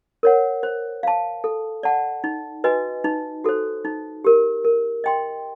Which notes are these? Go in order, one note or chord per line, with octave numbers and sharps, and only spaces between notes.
A#4 C#5 F#5
C5
F5 A5
A4
D5 F#5 A5
D#4
F#4 B4 D#5 G#5
D#4
F#4 A4 C5
D#4
G4 A#4
A#4
D#5 G5 C6